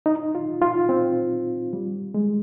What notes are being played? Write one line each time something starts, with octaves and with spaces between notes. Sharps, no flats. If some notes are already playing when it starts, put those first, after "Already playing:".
D#4
F4
F4
C4
G3
G#3